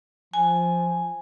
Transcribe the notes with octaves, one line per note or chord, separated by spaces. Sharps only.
F3 G#5